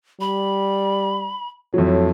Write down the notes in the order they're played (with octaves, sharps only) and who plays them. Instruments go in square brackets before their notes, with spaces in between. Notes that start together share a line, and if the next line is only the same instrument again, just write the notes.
[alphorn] G3 [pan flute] B5
[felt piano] F2 F#3 [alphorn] A2